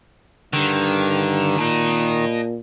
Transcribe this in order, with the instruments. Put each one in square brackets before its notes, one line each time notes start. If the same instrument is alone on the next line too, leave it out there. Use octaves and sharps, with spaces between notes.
[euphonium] G2 [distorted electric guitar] D3 [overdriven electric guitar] D#3
[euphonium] A#2 [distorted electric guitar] D#5 A5